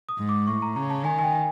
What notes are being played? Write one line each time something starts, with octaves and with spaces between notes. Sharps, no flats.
D#6
G#2
D6
A2 C#6
A#5
C#3 A#5
A5
D#3 G#5
G#5
G5